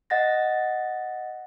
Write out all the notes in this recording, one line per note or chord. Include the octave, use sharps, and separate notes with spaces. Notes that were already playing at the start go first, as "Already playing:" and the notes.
D#5 F#5 A6 A#6